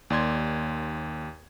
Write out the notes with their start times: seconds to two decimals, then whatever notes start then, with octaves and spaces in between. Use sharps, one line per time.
0.10 D#2 D5 C6 G#6